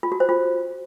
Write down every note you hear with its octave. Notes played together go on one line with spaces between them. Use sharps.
F4
F#4
C5
F4